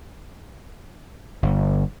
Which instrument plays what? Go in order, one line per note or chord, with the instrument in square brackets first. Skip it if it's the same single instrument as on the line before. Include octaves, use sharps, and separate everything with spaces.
[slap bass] G1